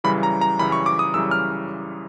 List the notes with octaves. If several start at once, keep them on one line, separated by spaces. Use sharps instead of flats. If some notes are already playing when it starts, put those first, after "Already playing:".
F#2 C#3 E3 G3 B5
A#5
A#5
F#2 C#3 E3 G3 B5
C#6
D6
D#6
F#2 C#3 E3 G3 E6
F6